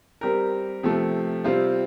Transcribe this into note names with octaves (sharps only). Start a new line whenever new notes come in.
G3 C4 G4 A#4
C3 F3 A3
C3 G3 C4 F4